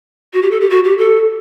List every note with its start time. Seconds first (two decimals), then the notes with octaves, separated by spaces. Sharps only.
0.34 F#4
0.42 G4
0.51 A4
0.61 G4
0.70 F#4
0.84 G4
0.98 A4